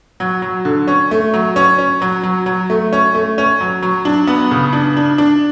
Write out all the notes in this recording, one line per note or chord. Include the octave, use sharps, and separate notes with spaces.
F#3
F#3
D3
C#4
A3
F#3
C#4
C#4
F#3
F#3
F#3
A3
C#4
A3
C#4
F#3
F#3
D4
B3
C#3
D4
D4
D4